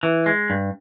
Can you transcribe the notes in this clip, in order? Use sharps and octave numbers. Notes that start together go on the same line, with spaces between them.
E3
G#3
G2